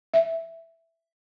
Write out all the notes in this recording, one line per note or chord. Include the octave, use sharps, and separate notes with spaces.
E5